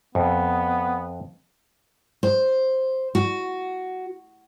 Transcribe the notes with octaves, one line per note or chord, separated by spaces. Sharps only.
F2 B3
C5
F#4